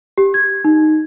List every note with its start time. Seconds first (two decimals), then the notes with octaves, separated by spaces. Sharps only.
0.18 G4
0.34 G#6
0.65 D#4